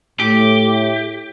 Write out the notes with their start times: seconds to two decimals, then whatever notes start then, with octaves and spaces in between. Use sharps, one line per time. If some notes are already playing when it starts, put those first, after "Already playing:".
0.20 A2 G4